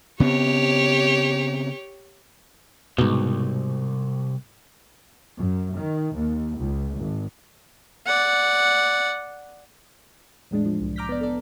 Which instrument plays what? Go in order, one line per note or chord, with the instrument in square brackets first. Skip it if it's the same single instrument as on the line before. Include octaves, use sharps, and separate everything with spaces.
[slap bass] C#3 B3 C4 [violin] G4 C#5
[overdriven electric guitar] C2 [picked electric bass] G#2 B2
[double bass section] F#2
D#3
D#2
C#2
G#1
[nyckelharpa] D5 F#5
[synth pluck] E2 A2 G#3 D4
F3
C2
A#5 D6 F6 G6 A#6 B6
B3 D5
A4 D5